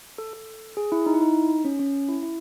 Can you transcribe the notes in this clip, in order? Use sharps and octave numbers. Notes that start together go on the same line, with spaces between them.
A4
A4
G#4
E4
D#4
E4
D#4
C#4
C#4
E4
E4